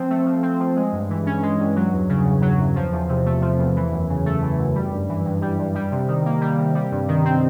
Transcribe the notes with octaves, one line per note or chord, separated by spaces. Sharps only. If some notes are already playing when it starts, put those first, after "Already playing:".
Already playing: F3 C4
A3
F3
C4
F3
G#3
G2
E3
C#4
G#3
G2
F#3
E2
C#3
E2
F#3
E2
F3
E2
C3
A3
F3
E2
E3
F#2
C#3
A3
E3
F#2
G3
G2
E3
G2
G3
G2
G3
C3
D#3
A#3
G3
C3
G3
G2
D#3
C4